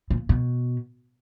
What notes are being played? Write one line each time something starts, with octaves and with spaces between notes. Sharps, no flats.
A#2
B2